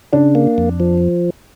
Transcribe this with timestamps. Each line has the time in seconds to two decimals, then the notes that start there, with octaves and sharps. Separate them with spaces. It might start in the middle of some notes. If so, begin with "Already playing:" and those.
0.13 C#3 D4
0.35 A#3
0.58 F2
0.80 F3